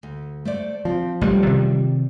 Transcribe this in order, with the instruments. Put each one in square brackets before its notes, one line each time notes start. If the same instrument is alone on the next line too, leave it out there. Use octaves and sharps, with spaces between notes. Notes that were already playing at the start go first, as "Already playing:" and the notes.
[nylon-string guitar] D2
A3 C5 D5
[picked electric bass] F3 [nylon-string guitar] C4
[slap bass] A1 A3 [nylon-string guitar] G3
[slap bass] C3 D#3